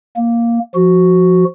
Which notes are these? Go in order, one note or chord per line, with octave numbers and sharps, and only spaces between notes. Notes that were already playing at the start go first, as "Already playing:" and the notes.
A#3
F3 F#4